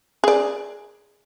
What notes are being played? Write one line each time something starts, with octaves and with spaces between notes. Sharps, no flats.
G#4 D5